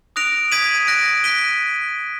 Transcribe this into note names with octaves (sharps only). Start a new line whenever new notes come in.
D#6 F#6 A#6 D7 F7
D#6 G#6 B6 D#7 F#7
F#6 A#6 D7
F#6 B6 D#7 G7